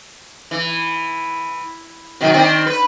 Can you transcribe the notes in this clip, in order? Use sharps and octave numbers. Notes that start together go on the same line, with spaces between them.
E3
B2 D#3 F#3
D#3 C4 D4
B4